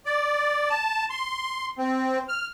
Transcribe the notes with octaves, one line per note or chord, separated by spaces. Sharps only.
D5
A5
C6
C4
F6